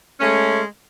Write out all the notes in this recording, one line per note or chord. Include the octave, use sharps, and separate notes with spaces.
G#3 A3 C#4